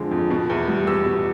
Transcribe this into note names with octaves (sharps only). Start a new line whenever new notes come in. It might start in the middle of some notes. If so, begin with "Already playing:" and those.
Already playing: F2 D3 F3 G#3
F2
B2
E2
G3
E2 E6
B2